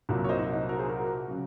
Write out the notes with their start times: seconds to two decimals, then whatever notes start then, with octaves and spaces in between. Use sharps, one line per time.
0.09 C2 A#2 F#3
0.24 C#5
0.29 C5 D#5
0.38 D#4 F#4
0.53 D#4 F#4
0.69 F#4 A#4
0.79 G#4 C5
0.88 F#4 A#4
1.28 C#3 F#3